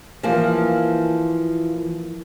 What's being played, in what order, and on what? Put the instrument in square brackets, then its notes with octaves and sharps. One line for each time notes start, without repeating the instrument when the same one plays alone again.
[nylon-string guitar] E3 F3 A#3